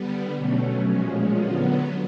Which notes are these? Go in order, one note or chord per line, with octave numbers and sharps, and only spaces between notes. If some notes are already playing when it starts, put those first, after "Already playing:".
Already playing: D3 G3 B3
B2 F#3 A3 C#4
A#2 F3 G#3 C#4 F#4
D3 F#3 B3 F4